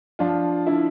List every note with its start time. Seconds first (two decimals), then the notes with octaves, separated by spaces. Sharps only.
0.19 F3 D4 F4
0.66 D3 E4